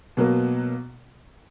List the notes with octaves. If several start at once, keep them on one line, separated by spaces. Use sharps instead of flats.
B2 F#3 A#3